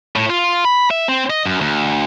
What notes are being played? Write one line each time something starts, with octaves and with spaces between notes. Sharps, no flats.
A2
F4
B5
E5
C4
D#5
F#2
D2